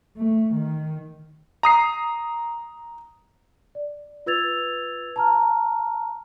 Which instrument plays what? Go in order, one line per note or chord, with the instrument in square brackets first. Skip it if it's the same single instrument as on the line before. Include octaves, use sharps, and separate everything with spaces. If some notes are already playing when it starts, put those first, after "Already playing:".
[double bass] A3
D#3
[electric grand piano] A#5 D#6 C7
[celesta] D5
F4 B4 E6 G#6 A6 F7
A5 A#5 F6